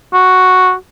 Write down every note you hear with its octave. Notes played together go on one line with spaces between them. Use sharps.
F#4